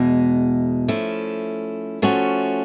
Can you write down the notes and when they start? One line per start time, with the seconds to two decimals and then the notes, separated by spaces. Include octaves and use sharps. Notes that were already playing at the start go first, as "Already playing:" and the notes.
Already playing: E2 B2 G#3
0.88 F3 A3 C#4 E4
2.02 F3 A3 C#4 F#4